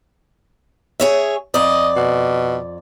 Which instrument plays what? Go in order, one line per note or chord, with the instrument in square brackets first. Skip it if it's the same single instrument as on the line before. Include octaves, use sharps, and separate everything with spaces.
[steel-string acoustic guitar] G#4 C#5 E5
[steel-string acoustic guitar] F2 D5 [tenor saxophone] D#5
[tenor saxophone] B2